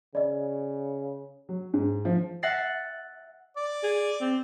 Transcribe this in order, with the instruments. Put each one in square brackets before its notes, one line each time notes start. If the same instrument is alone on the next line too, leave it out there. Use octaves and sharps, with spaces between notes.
[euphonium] C#3 [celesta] D5 D#5
[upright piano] F#3
G#2
F3
[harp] E5 F#5 F#6 A6 A#6 C7
[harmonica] D5
[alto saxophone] G#4
C4